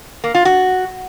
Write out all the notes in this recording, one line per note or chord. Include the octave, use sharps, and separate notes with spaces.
A#3
F4
F#4